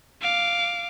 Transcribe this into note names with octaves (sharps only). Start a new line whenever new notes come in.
F5 D6